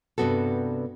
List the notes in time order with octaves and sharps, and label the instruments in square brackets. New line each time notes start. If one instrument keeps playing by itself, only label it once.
[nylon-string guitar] G2 C3 B3 F#4 A4